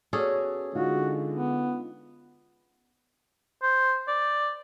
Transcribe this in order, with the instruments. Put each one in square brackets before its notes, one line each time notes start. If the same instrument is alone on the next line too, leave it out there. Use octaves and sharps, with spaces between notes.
[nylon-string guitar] B3 F#4 D5 [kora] C#4 G#4 A4
[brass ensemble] D3 G#3 [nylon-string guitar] D#4 F4 [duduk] F#4
[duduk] B3
[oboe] C5
D5